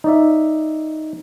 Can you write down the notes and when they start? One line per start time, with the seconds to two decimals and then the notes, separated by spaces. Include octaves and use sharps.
0.04 D#4 D5 E5